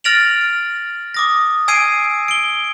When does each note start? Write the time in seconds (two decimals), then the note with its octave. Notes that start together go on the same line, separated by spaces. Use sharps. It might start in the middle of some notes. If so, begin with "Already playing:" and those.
0.04 F6 A6 A#6 D7 F7 F#7
1.14 D6 D#6 A#6
1.68 G#5 E6 G#6 C7 D7 D#7
2.28 D7 G7